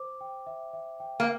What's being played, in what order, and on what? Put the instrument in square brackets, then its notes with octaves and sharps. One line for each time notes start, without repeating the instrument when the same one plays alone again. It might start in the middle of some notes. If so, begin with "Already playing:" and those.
Already playing: [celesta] C5 D6
G5
E5
E5
G5
[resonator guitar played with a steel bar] A#3